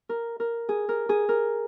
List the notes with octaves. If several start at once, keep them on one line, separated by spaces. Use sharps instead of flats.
A#4
A#4
G#4
A#4
G#4
A#4